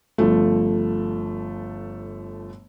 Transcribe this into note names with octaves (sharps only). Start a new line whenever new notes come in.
G1 F3 A3